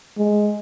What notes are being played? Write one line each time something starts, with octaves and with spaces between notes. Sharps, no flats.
G#3